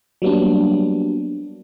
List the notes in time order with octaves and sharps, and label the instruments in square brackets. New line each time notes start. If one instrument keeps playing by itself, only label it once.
[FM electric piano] F#3 G3 A#3 B3 D4